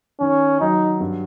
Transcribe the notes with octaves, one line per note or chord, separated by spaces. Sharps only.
D#3 C#4
F#3 D#4
G2